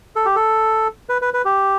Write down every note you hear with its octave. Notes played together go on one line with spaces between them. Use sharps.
A4
G4
A4
B4
B4
B4
G4